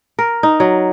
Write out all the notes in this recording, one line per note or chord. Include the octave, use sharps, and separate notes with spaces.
A#4
D#4
F#3